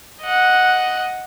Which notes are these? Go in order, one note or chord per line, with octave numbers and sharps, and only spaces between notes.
D#5 F#5